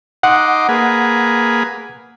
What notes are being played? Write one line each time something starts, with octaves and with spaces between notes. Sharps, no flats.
D#4 F#5 C6 D6
A#3 G#4 B4